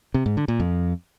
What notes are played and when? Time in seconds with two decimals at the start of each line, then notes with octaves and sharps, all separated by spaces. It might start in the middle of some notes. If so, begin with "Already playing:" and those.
0.14 C3
0.26 G#2
0.37 D3
0.48 A#2
0.60 F2